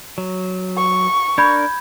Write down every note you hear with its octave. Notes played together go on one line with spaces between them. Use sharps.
F#3
C#6
D4 A#4 B5 G6 G#6